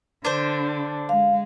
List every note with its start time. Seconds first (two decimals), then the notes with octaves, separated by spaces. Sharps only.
0.25 D3 D4 C5
1.09 G#3 F5